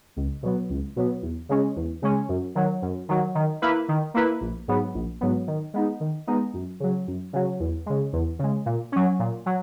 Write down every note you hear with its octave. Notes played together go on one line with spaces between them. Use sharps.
C#2
B2 F#3 B3
C#2
B2 F#3 B3
E2
C#3 G#3 C#4
E2
C#3 G#3 C#4
F#2
D#3 F#3
F#2
D#3 F#3
D#3
A#3 E4 B4
D#3
A#3 E4 B4
A#1
G#2 F#3 B3
A#1
G#2 F#3 B3
D#3
G#3 B3 D#4
D#3
G#3 B3 D#4
F#2
C#3 F#3
F#2
C#3 F#3
E2
C#3 G#3
E2
C#3 G#3
A#2
F#3 C#4
A#2
F#3